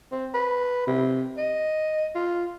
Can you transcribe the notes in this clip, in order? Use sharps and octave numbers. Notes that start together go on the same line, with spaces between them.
C4
B4
C3
D#5
F4